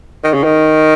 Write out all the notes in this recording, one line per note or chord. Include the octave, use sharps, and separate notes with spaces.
D#3
C#3
D#3